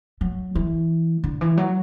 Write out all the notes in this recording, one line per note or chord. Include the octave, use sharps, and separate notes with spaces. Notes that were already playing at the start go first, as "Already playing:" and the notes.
F#3
E3
D3
E3
F#3